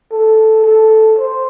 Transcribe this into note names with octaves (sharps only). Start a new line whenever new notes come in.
A4
A4
C5